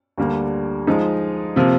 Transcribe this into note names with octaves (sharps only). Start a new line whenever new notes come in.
D2 D3 G3 A#3
F3 G#3 D#4
C3 F3 A#3